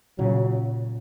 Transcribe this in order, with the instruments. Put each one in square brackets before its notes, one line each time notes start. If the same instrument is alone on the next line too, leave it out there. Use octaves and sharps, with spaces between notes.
[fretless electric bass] A#2 C#3 [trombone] F#3